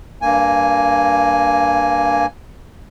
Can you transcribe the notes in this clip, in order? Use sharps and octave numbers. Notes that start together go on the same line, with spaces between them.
G2 A#3 G#5